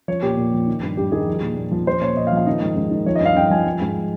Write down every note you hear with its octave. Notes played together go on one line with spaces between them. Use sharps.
F3 C#5
A#2 G4
A#2
F3
D#3
G2
G2 G4
D#3 G#4
F3
A#2
A#2
F3
F3 C5
A#2 C#5
A#2 D#5
F5
F3
F5
D#3 D#5
G#2
G#2
D#3
F3 C#5
D#5
G2 F5
G2 G5
F3 G#5
F3
G#2